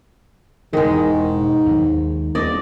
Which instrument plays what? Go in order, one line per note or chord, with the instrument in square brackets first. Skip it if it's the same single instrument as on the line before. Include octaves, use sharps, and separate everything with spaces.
[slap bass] E1 E3 [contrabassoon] G#2 [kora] D#3 G#3
[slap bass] D#2 F#3
[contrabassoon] D#1 [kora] D5 D#5